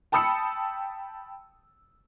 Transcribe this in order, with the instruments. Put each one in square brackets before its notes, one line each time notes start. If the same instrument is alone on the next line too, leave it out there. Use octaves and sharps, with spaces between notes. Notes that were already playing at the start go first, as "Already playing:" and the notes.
[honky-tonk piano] G5 A5 B5 D#6 E6 C#7